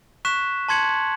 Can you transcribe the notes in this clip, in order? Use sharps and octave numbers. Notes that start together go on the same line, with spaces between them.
C#6 F#6 B6 E7
A5 C6 G#6 C#7 F#7